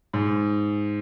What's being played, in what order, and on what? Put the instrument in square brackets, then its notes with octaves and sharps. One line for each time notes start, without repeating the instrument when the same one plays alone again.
[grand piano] G#2